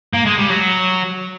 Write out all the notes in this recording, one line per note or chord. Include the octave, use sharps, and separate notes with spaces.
A#3
G#3
G3
F#3